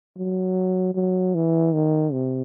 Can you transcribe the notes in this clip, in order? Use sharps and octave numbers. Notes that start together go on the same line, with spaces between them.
F#3
F#3
E3
D#3
C3